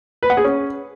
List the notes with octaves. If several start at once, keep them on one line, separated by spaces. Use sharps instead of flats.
B4
F#5
G#4
C#4